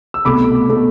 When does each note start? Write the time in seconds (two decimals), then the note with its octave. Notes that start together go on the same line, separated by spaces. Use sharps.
0.14 E6
0.25 C2 B2 A3 B5 D6
0.69 B2 A3